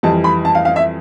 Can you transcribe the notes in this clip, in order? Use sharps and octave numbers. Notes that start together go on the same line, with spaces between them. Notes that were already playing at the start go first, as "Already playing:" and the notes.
F2 E3 G3 A5
B5
A5
F5
F5
E5